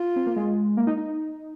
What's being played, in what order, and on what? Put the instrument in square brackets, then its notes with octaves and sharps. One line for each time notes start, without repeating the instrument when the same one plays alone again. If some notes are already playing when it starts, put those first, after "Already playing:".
Already playing: [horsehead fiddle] F4
[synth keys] C4
A#3
G#3
A#3
D#4
D#4